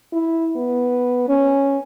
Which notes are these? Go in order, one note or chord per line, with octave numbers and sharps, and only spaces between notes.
E4
B3
C#4